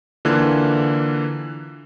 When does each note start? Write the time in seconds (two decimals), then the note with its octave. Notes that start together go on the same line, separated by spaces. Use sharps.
0.25 D3 E3 A#3 F4 F#6 G#6